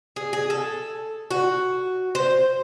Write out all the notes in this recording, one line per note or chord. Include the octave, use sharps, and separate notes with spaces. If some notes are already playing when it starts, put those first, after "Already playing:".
G#4
G#4
A4
F#4
C5